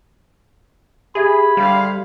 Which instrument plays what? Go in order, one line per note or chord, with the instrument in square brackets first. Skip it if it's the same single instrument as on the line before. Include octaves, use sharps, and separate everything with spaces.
[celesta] G4 E5 G#6 [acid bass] G#4 [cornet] B5
[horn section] D3 C5 F5 [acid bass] G3